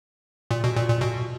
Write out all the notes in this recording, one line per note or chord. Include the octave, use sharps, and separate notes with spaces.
A#2
B2
A#2
A#2
B2